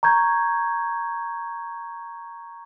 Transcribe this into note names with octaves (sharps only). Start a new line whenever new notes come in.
A#5 C#6 G6 G#6